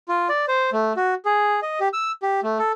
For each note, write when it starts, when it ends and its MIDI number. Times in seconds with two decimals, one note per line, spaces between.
0.08 0.28 65
0.29 0.45 74
0.48 0.70 72
0.73 0.93 57
0.96 1.14 66
1.25 1.60 68
1.62 1.79 75
1.80 1.88 67
1.93 2.12 88
2.22 2.40 67
2.43 2.58 57
2.59 2.72 69